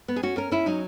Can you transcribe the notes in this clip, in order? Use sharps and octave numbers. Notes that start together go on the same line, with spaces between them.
B3
G#4
C#4 F#4
C#4 A#4
C#4 E4
F#3 D#4